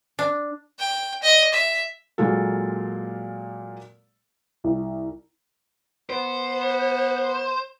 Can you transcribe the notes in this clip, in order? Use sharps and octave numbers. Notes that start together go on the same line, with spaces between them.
D4
G5
D#5
E5
A#2 F#3 G#3 A#3 A4
C2
B3 C5